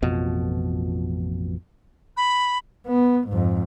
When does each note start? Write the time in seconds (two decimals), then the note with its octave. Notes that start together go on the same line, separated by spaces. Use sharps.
0.02 A1 F2 B2 F3
2.17 B5
2.87 B3
3.29 F2 G#2